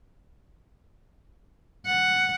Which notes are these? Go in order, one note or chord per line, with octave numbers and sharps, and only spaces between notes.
F#5